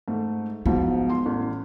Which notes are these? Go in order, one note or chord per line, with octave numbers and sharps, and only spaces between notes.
G#2 A3
G#2 F3 F#3 B3
C6
A1